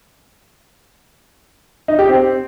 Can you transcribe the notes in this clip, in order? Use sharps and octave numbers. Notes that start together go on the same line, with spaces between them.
D#4
G4
C4